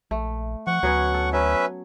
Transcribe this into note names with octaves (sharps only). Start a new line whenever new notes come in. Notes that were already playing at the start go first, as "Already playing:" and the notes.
A#1 A3
F3 F#5 C#6
D2 F#3 B3 C#4
A4
F#3 C#4 B4 E5